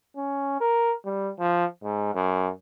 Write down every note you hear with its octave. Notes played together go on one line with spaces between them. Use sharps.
C#4
A#4
G3
F3
G#2
F#2